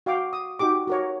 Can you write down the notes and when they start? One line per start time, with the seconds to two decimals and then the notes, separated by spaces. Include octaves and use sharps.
0.06 F#4 F5 G5 D6
0.33 D#6
0.59 D#4 F#4 G4 D6
0.87 F#4 A#4 C#5